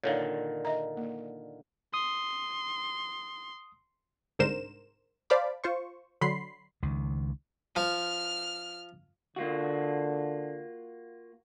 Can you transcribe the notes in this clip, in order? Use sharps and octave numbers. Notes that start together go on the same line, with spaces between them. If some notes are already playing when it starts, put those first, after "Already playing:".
A#2 D3 D#3 C#5 F5
D#5 E5 A#5
A#3
C6 D#6
C2 G#2 D3 A#4 C5 E7
C5 D5 F5 A5 B5 D6
F4 C5 C#6
D3 F#3 B5 C6 C7
C#2 D#3
F3 F6
D3 A#3 F4 F#4